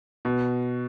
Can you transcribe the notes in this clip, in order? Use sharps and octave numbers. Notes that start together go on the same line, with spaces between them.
B2